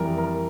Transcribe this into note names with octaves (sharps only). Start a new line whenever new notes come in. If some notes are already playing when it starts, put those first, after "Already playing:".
Already playing: F2 E3 G3 A#4
A#4